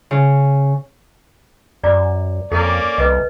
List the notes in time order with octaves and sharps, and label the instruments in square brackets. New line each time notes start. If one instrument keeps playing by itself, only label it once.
[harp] C#3
[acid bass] F#2 [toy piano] D5 A#5 D6
[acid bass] F2 [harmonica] A#3 C#4 D5 [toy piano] A4
[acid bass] C2 [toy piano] B4 D#5